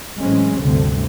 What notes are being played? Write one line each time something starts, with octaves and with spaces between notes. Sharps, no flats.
A2 E3 F#3 G#3 C4 C#4
F1 D2 G2 D3 A3 C4